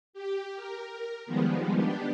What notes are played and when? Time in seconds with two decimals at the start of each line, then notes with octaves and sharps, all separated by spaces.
0.13 G4
0.56 A#4
1.26 D#3 F3 G3 G#3 B3
1.76 B3 D4 G4